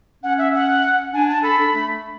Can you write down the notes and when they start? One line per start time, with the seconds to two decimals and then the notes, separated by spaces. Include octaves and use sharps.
0.23 C#4 F#5
0.38 E5
0.54 F#5
1.13 D4 G#5
1.29 A5
1.43 A4 B5
1.58 D4
1.74 A3